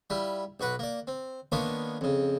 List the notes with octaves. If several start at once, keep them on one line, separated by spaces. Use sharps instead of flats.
G3 E4 F4
B1 F#4 B4 F#5
A#3 D5
C4
D#3 A#3 B3 D4 F4 C#5
F2 C#3